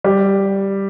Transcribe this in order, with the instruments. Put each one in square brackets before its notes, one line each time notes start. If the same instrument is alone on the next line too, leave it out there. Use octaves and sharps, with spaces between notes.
[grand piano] G3